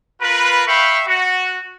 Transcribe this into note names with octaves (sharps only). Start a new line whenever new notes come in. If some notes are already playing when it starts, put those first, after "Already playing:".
F4 A#4 B4
E5 F5 G5 B5 C#6
F#4